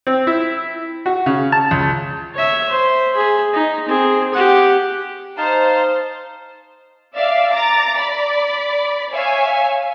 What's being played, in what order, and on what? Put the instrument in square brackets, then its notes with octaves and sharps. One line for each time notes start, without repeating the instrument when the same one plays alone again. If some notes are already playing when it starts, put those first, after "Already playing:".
[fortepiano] C4
E4
F#4
C#3
A5
C#2
[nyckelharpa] C#5 E5
C5
G#4 B5
D#4
C4 G#4
G4 F#5
[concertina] D#4 F5 A5 [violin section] C5
[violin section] D5 E5 F5
A#5 D6 A6
D5 B5
C#5 E5 F5 G#5